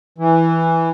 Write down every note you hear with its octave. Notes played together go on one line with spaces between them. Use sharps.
E3